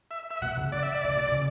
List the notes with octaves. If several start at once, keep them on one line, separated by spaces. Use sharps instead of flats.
E5
E5
B2 F#5
C#3
C#3 D5
E5
D5
C#3
B2
C#3